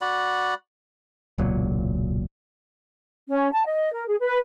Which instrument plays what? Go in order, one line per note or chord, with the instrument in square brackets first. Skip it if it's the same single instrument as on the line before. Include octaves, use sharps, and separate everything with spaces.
[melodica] F#4 D5 F#5 B5
[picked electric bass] E1 C#2 A#2 F#3
[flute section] C#4
A5
D#5
A#4
G#4
B4